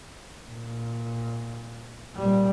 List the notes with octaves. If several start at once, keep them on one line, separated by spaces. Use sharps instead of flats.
A#2
A#2 G3